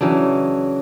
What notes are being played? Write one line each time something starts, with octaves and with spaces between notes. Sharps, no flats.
C#3 E3 F#3 D4